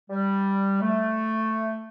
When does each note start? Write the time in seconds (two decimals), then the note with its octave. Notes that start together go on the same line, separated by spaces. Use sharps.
0.09 G3
0.82 A3